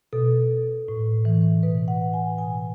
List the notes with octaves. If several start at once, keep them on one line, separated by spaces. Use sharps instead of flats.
B2 A4
A2
E3
B2 B4
F#5
G#5
B2 G#5